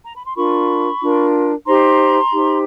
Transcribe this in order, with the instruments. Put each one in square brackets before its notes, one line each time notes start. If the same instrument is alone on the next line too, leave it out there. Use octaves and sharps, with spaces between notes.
[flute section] A#5
B5
C6
D4 F4 A#4 B5 C#6
D4 F4 A#4
D#4 G4 C5 A#5 C6
D#4 G4 C5